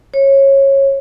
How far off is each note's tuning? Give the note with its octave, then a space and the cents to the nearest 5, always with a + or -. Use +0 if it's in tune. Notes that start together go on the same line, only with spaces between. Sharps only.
C#5 -20